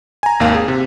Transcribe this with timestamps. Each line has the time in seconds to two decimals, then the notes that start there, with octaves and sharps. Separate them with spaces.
0.23 G#5 A#5
0.40 G#1 D#2 A#3 F5
0.55 G#4
0.68 C3